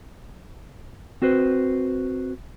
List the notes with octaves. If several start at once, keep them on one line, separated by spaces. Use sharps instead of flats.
C4 F#4 B4 C5